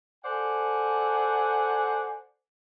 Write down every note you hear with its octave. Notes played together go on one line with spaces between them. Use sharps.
A4 C5 D5 F#5 G#5